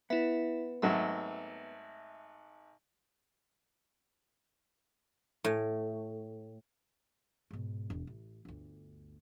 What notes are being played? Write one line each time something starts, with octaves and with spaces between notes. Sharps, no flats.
B3 E4 E5
G#1 F#3 A3 E5
A2
G#2 B2
E1
A1
G1 D2